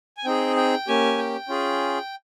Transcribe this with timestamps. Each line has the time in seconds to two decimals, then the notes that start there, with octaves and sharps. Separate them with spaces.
0.17 G#5
0.25 C4 D#4 G#4 G5
0.56 G5
0.88 A#3 C#4 G4 G#5
1.18 G5
1.49 C#4 F4 G#4